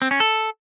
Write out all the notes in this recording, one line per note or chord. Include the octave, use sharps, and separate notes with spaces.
C4
C#4
A4